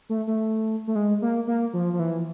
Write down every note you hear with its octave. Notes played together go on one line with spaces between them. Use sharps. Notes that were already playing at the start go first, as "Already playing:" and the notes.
A3
A3
A3
G#3
A#3
A#3
F3
F3
E3